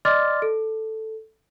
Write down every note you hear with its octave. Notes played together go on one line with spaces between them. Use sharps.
D5 D#5 C6 D6 F6 A6
A4